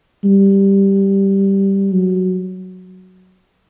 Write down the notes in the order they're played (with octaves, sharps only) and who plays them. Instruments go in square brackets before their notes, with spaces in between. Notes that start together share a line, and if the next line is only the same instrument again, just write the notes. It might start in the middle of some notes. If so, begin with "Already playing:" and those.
[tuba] G3
F#3